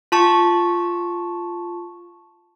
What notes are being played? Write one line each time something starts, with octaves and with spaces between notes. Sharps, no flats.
F4 A5 C#6